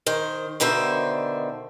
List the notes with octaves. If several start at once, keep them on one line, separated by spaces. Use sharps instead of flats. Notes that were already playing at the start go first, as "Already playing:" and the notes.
D#3 C5
B2 D3 D#3 C5 E5